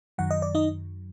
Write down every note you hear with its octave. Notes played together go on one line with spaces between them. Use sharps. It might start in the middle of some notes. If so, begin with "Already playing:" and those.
F#2 D#3 F#3 F#5
D#5
D5
D#4 D#5